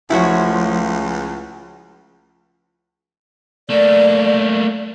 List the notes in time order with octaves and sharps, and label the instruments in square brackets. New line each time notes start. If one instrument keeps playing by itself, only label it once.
[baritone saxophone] C#2 [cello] F3 A3 [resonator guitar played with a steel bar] E4 F#4 C#5
[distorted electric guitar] A3 A#3 [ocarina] D5